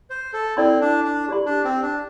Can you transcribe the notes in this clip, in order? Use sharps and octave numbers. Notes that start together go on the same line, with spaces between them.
C5
A4
C4 E4 A4 D5 C6
D4
D4
G4 D5 C6
D4
C4
D4